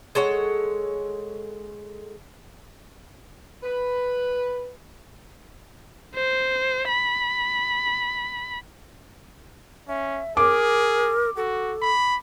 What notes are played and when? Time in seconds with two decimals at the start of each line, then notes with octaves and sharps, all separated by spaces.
0.15 G#3 A4 C#5 F#5
3.63 B4
6.15 C5
6.88 B5
9.88 C#4 E5
10.37 G#4 A#4 D6
11.37 F#4 A4
11.82 B5